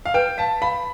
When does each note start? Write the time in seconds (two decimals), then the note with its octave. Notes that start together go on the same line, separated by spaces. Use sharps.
0.05 F5
0.14 B4 G5
0.38 F5 A5
0.62 F5 B5